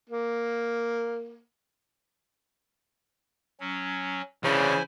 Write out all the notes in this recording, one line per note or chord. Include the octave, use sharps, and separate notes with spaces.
A#3
F#3 C#4
C#3 E3 D4 E4 C5 G#5